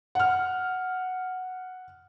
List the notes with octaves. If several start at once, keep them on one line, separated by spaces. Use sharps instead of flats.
F#5 F6